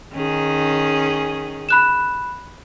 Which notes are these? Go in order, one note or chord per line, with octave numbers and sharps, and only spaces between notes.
D#3 C#4 G#4
B5 F#6 E7